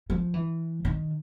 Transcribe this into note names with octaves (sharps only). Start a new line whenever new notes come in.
F3
E3
D#3